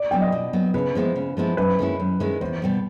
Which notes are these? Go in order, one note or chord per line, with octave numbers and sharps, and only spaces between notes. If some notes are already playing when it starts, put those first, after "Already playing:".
Already playing: D5
F#3 B3 G5
D#5
B2
F#3 B3
C#3 B4
F3 G#3 B3 E4
C#3
F3 G#3 B3 E4
F#2 B4
D#3 G#3 C#4 E4
F#2
D#3 G#3 C#4 E4
E2 C5
B2 G3 B3